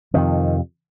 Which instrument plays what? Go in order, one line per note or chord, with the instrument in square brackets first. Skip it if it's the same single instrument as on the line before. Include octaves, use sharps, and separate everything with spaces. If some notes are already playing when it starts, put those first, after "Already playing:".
[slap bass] F2 C3 D#3